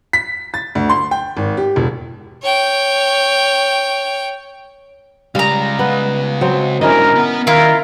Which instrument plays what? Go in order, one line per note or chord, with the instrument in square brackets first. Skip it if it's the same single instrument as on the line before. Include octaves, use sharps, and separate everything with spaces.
[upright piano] B6
A6
D2
C6
G5
G#1
G4
E1
[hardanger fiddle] C#5 G5
[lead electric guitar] C#3 G#3 [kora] G3 [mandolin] F5 A#5
[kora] B3
F#3 C4
[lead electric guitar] G#2 D3 [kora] C#4 E4 D#5 [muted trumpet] A#4
[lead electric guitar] B3 F#5
[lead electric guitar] D#3 [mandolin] E4 F4 [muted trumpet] A#4